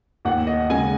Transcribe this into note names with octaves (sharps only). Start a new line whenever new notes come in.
D#2 F#5
D#5
C#3 G#3 G#5